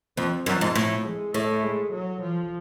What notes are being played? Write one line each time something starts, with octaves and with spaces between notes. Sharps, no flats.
F2 F3
F#2 F3
G#2
A2 F3
G#3
A2 A3
G#3
F#3
F3